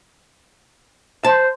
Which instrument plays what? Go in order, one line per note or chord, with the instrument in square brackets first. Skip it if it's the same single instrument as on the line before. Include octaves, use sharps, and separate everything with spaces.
[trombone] C5 [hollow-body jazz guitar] A5